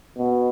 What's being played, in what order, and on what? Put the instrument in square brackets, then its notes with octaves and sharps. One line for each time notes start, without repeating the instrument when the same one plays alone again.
[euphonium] B2